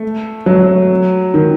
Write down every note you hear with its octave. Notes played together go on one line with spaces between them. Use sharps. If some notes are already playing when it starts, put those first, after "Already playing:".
Already playing: A3
F#3
D#3